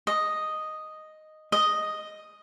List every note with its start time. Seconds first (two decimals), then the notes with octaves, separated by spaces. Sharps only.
0.07 D#5
1.52 D#5